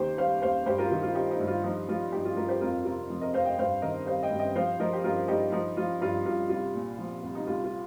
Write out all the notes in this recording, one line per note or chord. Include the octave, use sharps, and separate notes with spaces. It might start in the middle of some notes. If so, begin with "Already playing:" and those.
Already playing: D#2 D#3 G4 C5
G3 C5 F5
D#2 C5 F5
G2 G4 C5
F4 A#4
D#3 F4
F4
G3 D#4 G4
D#4 G4
G2
F4
F3 D#4
F3 F4
G2 D#4 G4
F4
G2 F4 A#4
G4 C5
F2 F4 A#4
C3 F4 A#4
F3
A#4 D#5
F2 C5 F5
D#5 G5
G2 C5 F5
D#3 A#4 D#5
G3 C5 F5
D#5 G5
G2
D#5 G5
F3 C5 F5
F3 A#4 D#5
G4
G2 F4 A#4
G2 D#4 G4
F3 D#4
F3 F4
G2 F4
G2 F4
C2 F4
A#2
F3
C2
D#4
C2 F4
F4